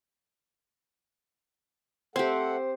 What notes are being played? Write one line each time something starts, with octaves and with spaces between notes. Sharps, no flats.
A3 C4 G4 A4 C5 F#5